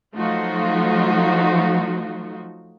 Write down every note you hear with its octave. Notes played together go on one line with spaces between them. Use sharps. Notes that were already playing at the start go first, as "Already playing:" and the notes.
F3 F#3 A3 D#4 F4 F#4